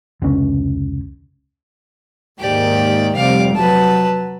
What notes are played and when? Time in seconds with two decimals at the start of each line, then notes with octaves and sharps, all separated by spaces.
0.22 F1 C#2 C#4
2.39 D#2 G#2 D#3 G4 D5
3.16 F1 C3 G3 F5 D6
3.56 F#3 B4 A5